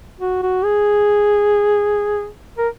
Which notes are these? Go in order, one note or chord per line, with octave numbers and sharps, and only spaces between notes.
F#4
F#4
G#4
A#4